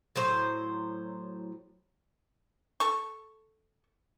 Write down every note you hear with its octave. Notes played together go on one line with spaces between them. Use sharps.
A2 F#3 C5
A4 C#6